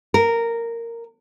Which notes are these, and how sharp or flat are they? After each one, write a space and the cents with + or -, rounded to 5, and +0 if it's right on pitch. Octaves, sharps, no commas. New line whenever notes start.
A#4 -10